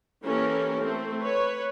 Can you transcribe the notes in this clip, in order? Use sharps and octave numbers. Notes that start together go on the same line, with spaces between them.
E3 A#3 C#4 G4 A4 A#4
A3 C4
B4 C#5